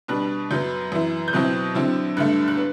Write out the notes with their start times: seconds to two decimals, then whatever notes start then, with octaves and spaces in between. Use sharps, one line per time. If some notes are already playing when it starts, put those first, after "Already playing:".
0.08 B2 G3 D4 F#6
0.51 F#2 F#3 B3 G6
0.92 F#2 E3 B3 E4
1.28 G6
1.33 B2 F#3 C4 E4 F#6
1.75 D3 F#3 C4 E4
2.17 G2 D3 A3 F#6
2.48 F#6
2.57 B3